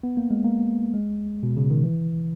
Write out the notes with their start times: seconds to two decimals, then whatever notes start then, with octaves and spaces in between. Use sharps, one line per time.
0.03 B3
0.17 A#3
0.31 G#3
0.44 A#3
0.94 G#3
1.43 B2
1.57 C#3
1.70 D#3
1.84 E3